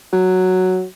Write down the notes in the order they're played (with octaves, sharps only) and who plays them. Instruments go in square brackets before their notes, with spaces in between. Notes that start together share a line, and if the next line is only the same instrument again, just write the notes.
[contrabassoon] F#3